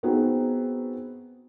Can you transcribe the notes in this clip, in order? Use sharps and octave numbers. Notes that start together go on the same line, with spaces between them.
B3 C4 D#4 F#4 G#4